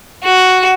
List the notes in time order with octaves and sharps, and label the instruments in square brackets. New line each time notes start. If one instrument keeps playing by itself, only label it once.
[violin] F#4